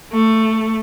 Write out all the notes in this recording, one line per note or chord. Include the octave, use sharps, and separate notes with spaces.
A3